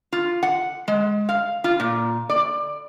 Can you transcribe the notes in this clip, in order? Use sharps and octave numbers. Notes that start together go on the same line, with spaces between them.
F4
F#5
G#3
F5
F4
A#2
D5